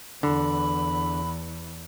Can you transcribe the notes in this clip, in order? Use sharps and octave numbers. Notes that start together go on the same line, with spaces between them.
E2 D3 E3 B5